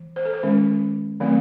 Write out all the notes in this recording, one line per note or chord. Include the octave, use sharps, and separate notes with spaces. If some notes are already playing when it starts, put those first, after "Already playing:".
Already playing: E3
C5
A4
C5
D#3 G#3 C#4
D#3 F#3 A3 C4